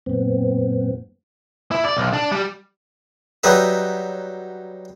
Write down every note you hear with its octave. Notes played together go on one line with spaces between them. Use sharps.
F#2 A#2 B3 C4
E4
D5
B1
D4
G3
F#3 G3 D#4 B4 E5